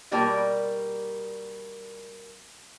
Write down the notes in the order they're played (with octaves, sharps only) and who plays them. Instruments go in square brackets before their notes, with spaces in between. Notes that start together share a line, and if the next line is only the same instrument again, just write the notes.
[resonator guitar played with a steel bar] B2 G3 A#3 A#4 D5 A5